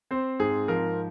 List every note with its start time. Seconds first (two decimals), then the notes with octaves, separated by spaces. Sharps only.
0.11 C4 C5
0.39 G#2 G#4
0.68 F3 A#4